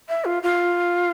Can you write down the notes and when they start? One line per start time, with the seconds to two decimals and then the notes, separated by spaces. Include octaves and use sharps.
0.09 E5
0.25 F4
0.43 F4